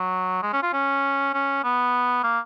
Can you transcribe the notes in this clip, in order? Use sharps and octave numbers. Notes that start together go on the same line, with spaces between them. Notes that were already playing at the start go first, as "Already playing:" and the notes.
Already playing: F#3
G#3
C#4
F4
C#4
C#4
B3
A#3